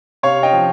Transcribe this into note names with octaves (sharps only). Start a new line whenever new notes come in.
C3 C#5 F5
D#5 G5
F3